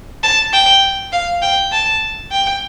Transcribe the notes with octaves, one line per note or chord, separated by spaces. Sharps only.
A5
G5
F5
G5
A5
G5